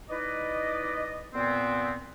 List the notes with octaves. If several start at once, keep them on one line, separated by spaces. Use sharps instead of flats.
D#4 E4 B4 D5 D#5
A#2 B3 C4